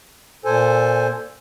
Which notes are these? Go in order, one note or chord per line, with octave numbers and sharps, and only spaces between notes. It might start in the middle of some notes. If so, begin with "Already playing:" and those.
A#2 A4 C5 G#5